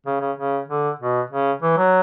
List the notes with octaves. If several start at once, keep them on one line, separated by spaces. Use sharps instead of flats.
C#3
C#3
C#3
D3
B2
C#3
E3
F#3